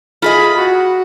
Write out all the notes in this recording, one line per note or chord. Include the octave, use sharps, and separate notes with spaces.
F4 G#4 D#5 B5
F#4